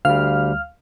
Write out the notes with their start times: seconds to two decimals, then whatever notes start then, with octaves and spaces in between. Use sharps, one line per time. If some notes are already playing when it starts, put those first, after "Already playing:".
0.05 D2 G3 F5 F6